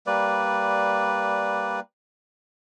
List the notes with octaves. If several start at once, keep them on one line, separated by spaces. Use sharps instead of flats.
G3 A#3 B4 D5